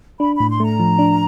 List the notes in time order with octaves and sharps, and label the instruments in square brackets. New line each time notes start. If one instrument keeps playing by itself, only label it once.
[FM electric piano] D4 [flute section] B5
[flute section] B5
[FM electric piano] A2
[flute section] C6
[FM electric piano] A3 [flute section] A#5
[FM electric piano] F3
D4